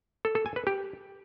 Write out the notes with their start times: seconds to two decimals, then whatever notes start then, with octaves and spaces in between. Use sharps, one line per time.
0.25 A4
0.35 A4
0.46 G#5
0.56 B4
0.67 G4